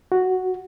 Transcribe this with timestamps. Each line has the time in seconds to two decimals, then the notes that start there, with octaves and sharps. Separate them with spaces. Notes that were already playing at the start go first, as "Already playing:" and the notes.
0.12 F#4